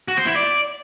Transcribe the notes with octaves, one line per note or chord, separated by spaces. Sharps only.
F#4
C5
E4
D5